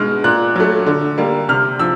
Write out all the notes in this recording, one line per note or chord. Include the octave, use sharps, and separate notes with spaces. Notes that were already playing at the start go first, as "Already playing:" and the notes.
Already playing: B2 G#3 F6
A#2 F#6
F#3 A3
D3
G3 A#3
C3 F6
F3 E6